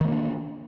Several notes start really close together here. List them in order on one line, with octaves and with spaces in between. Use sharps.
D#3 A3 A#3 D4